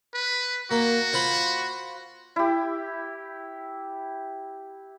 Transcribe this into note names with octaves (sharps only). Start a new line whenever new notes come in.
B4
A#3 F#4
F4 C5 B5
E4 G4